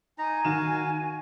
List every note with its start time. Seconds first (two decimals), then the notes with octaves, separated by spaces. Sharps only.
0.18 D#4 G#5 A#5
0.45 D#3 F#4 F5 E7